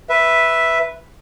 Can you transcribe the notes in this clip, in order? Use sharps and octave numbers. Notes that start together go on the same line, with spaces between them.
B4 E5